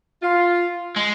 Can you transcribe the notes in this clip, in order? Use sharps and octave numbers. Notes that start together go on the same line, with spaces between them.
F4
G#3